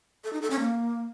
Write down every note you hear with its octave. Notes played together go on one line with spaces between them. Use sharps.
A4
D#4
A4
C#4
A#3